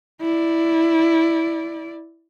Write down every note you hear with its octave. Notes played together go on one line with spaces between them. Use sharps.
E4 D5